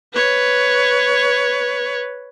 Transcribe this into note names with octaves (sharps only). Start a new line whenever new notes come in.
B4 C#5